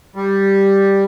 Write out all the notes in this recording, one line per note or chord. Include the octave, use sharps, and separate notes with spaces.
G3